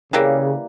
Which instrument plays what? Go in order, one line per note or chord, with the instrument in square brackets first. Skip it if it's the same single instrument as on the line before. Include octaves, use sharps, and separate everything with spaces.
[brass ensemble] C#3 [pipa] E3 G3 A#3